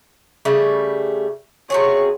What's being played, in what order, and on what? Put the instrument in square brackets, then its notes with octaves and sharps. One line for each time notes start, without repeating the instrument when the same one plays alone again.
[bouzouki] C#3 G3 A3
[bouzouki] C3 F#4 G#4 [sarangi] C#5